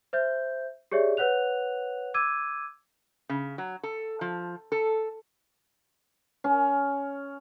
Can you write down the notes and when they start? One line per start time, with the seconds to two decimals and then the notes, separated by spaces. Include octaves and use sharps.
0.13 C5 E5 G6
0.92 G4 G#4 C#5 D5 E5
1.17 B4 C#5 F#5 F#6 F7
2.14 D6 E6 G#6 D#7
3.29 C#3
3.58 F#3
3.83 A4
4.21 F3
4.72 A4
6.44 C#4